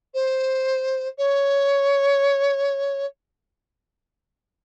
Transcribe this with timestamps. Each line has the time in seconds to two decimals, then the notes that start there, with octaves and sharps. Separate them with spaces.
0.14 C5
1.18 C#5